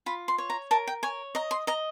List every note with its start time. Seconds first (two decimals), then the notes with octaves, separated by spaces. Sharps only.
0.06 F4 B5
0.28 C6
0.38 C#5
0.50 A#5
0.71 A#4 A5
0.87 G5
1.03 C#5 G#5
1.35 D#5 A#5
1.51 C6
1.67 D#5 A#5